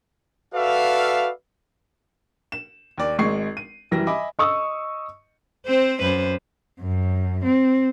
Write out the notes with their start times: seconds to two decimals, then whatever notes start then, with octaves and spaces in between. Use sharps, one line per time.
0.55 F#4 A4 B4 D5 E5 F5
2.52 E7
2.98 D#2 D5
3.19 G#1 G#3 C#6 C7
3.57 D#7
3.91 F#2 E3 G3 A#6
4.07 D#5 E5 G#5 B5 D6
4.39 D#5 C#6 D#6 E6
5.66 C4 C5
6.01 F#2 B4 C5
6.81 F#2
7.44 C4